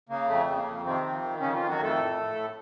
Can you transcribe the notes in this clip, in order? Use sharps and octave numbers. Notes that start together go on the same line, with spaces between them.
C#3 A#3
F2 A3
C#3
A#3
F2
C3 D#3 C4
F2
D#3
F2 C#3 C#4
D#3 F3 F4
F#3 F#4
F2 A3 A4
A2
A2
A2